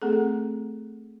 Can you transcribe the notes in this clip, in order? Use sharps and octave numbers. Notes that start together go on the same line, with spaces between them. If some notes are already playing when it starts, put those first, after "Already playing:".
A3 C4 G#4 A4